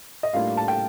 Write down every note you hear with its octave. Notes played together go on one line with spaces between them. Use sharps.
D#5
A2 G3 A#3 D4 F4 F5
A5
G5